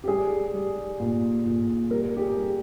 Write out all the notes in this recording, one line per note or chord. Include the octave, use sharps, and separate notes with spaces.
G4
G3 G#4
G3
A#2
A#2
G3 A#4
G4
G#4
G3